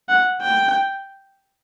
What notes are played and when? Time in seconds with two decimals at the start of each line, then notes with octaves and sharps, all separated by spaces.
0.09 F#5
0.42 G5